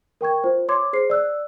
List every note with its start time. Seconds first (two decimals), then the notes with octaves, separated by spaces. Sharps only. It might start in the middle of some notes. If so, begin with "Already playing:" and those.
0.21 A#4 G5 C#6 G#6
0.44 F4 C5
0.68 C#5 C6 D6 G#6
0.93 G#4 C5 C7
1.10 D5 E6 F#6